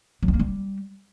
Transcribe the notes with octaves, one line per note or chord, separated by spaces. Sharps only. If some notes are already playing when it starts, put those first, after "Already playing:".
F#3
B3
A#3
G3